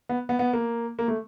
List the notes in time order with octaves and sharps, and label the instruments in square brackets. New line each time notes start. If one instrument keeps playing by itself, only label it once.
[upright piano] B3
B3
B3
A#3
A#3
A3